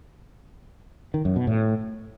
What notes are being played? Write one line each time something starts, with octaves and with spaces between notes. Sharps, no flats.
D#3
F#2
B2
A2